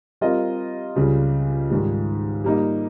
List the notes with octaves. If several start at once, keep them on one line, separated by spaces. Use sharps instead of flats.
G3 C4 F4 A#4 D#5
C#2 C#3 G3
G#2 D#3 G3
G3 A#3 D#4